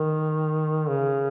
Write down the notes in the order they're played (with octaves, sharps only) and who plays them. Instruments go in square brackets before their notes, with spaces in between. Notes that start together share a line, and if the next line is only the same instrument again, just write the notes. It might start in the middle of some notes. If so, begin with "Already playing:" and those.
Already playing: [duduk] D#3
C#3